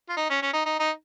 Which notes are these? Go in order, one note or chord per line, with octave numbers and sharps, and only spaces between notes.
F4
D#4
C#4
C#4
D#4
D#4
D#4